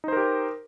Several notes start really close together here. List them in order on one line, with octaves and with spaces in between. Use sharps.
D#4 C5 A#4 G4